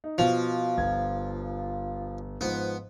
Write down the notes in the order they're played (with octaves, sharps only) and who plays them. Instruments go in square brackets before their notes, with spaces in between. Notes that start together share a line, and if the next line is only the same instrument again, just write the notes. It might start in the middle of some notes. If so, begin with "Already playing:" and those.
[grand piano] D#4
[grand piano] B2 F7 [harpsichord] F3
[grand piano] G1 G#6
[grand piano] G#2 F3 [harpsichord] B3